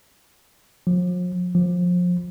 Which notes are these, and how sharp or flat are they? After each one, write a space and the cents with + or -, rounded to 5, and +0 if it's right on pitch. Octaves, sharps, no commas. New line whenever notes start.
F3 +40
F3 +25